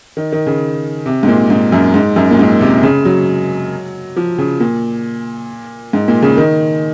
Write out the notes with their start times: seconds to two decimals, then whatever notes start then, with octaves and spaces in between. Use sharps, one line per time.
0.17 D#3
0.32 D#3
0.47 C#3
1.06 C3
1.23 G#2
1.28 A#2
1.50 G#2
1.72 F#2
1.94 G#2
2.16 F#2
2.31 A#2
2.39 G#2
2.61 C3
2.83 C#3
3.05 F#3
4.16 F3
4.38 C#3
4.60 A#2
5.93 G#2
6.08 A#2
6.22 C#3
6.37 D#3